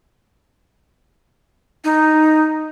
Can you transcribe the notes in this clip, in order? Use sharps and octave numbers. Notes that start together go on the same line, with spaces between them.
D#4